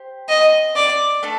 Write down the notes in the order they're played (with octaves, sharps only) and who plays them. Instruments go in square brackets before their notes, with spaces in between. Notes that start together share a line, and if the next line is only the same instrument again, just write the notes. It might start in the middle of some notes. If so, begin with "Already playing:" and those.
Already playing: [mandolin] G4 C5
[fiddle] D#5
D5
[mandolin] A3 D4 A4